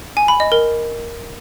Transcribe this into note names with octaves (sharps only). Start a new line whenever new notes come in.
G#5
B5
D#5
A#4